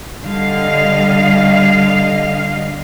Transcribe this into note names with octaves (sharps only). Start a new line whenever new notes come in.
D3 G3 D#5 F5